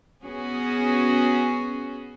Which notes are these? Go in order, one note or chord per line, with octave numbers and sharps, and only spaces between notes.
B3 C#4 F#4 G#4